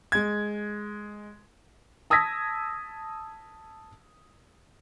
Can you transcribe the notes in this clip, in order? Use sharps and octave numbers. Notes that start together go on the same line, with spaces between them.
G#3 G#6
A5 D#6 E6 G#6 A#6 B6